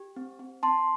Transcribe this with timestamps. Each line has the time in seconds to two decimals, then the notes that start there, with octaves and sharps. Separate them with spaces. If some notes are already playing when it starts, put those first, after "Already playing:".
Already playing: G4
0.16 C4
0.39 C4
0.63 C4 A5 C6